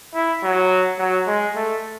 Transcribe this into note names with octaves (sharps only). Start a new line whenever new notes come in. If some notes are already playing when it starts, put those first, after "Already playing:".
E4
F#3
F#3
G#3
A3